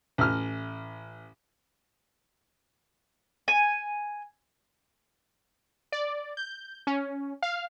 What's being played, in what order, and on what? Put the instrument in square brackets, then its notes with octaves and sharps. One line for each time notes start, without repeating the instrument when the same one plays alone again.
[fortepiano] A1 F6
[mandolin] G#5
[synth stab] D5
G6
C#4
F5